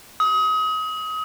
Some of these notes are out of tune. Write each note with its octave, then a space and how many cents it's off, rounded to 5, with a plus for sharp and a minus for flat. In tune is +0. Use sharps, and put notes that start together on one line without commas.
D#6 +30